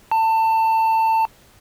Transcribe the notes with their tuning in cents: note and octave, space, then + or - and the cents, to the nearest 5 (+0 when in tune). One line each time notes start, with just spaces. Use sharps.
A5 +25